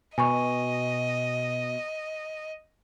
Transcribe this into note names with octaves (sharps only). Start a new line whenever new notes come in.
B2 D#5 G#5 C#6